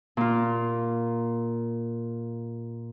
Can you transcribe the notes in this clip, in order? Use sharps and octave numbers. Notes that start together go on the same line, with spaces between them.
A#2 F4